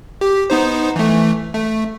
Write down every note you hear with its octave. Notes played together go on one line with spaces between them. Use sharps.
G4
B3 D#4 C5
E3 A3
A3